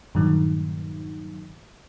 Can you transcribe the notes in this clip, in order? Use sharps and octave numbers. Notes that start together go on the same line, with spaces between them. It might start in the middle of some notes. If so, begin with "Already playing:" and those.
G2 A#2 D#3 F#3